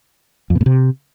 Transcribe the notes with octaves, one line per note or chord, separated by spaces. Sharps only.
F2
B2
A2
C3